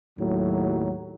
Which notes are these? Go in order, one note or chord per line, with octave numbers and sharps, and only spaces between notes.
D#2 A2 F#3